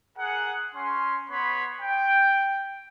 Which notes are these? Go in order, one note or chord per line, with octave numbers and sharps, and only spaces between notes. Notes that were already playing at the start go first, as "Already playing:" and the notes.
G#4 A#4 F#5
C#4 C6
B3 C#5 B5 C6
G5